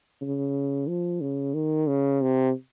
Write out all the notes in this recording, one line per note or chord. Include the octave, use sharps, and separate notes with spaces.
C#3
F3
C#3
D#3
C#3
C3